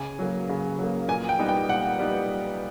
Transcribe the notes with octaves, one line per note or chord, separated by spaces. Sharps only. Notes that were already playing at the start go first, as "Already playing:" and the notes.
Already playing: C#3 G#5
F#3 A#3
C#3
F#3 A#3
A#2 G#5
G5
G3 B3 D#4
G5
A#2 F#5
G3 B3 D#4